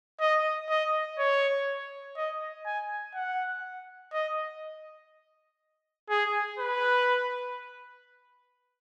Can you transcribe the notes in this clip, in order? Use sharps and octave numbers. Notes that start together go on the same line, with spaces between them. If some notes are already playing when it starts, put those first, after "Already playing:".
D#5
D#5
C#5
D#5
G#5
F#5
D#5
G#4
B4